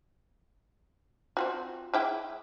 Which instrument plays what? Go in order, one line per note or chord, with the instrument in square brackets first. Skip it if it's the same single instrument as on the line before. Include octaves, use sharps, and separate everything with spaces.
[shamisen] C4 F4 F#4
G#3 E4 G5